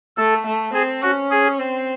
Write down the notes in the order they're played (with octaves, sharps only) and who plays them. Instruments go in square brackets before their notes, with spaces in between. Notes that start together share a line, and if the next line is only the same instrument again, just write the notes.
[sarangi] A3 [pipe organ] A4
[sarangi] A3
[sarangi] C4 [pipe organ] G#4
[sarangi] C#4 [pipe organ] F#4
[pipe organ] G#4
[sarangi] C4